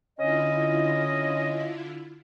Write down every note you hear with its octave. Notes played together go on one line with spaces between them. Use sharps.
D3 C#4 E4 F4 D#5